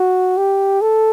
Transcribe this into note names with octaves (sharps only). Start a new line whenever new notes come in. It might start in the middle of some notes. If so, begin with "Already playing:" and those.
Already playing: F#4
G4
A4